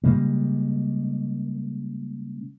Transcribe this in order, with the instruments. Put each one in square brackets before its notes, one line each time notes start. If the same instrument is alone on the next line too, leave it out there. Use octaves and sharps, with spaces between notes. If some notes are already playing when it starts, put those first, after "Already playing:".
[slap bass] C#3 G3 G#3 A#3